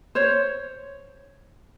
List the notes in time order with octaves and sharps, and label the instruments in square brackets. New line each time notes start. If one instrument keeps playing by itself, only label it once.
[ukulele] C5 C#5